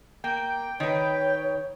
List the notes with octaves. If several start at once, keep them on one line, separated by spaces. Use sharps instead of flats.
A#3 G5
D#3 B4 C#5